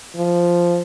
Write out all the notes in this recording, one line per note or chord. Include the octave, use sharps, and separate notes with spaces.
F3